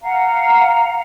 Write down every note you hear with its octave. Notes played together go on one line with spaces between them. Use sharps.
F5 F#5 A#5